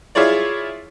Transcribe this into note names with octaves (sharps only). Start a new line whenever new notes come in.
E4 F4 G#4 C#5 D5